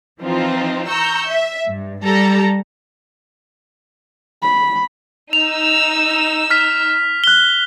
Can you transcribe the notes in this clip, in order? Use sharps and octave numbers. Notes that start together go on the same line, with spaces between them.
E3 F3 C4 D#4 F4
A#5 C#6 E6 G6
E5
G2
G3 G4 A4 A#5
B5
D#4 E6 F7
F6 B6
F#6 G7